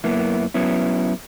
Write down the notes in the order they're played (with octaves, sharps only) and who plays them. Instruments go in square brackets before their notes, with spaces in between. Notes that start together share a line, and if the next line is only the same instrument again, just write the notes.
[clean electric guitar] F#2 A#3 B3 E4
F#3 B3 C#4 E4